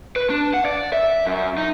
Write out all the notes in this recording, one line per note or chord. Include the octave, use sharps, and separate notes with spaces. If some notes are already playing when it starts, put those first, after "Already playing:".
B4
D4
F#5
D5
E5
F#2
D#4